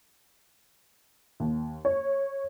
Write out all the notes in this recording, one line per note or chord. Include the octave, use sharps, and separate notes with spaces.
D#2
C#5